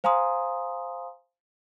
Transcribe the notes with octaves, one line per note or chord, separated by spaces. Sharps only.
C5 F5 G#5 A#5 C6 D#6